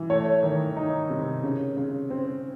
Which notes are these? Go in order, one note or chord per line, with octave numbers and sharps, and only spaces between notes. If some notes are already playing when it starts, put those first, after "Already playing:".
Already playing: E3
A3 C#5
D#3
D#4
C3
C#3
C#3
C4